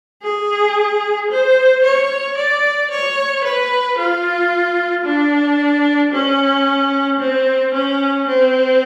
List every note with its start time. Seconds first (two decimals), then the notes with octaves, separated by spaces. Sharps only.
0.23 G#4
1.31 C5
1.84 C#5
2.38 D5
2.91 C#5
3.44 B4
3.98 F4
5.05 D4
6.12 C#4
7.20 C4
7.74 C#4
8.28 C4